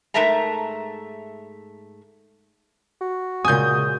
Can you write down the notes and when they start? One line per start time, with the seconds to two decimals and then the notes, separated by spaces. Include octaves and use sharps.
0.14 G#2 A3 A#4 E5 A5 A#5
3.01 F#4
3.45 A#2 C#3 G#3 G#5 D#6 G6